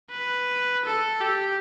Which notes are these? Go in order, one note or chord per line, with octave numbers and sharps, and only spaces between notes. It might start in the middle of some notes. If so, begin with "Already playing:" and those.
B4
A4
G4